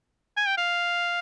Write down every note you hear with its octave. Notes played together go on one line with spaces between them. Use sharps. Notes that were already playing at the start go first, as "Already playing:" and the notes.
G#5
G5
F5